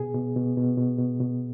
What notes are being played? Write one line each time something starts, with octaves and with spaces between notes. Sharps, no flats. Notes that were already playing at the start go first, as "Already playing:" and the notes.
Already playing: B2 G#4
B2
B2
B2
B2
B2
B2